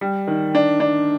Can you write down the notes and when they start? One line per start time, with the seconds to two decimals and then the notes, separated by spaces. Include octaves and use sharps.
0.01 G3
0.27 D#3
0.55 D4
0.80 D4